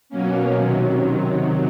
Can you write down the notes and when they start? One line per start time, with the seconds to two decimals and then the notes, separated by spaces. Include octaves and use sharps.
0.09 B2 F#3 A#3 C#4
0.53 C3 D#3 F#3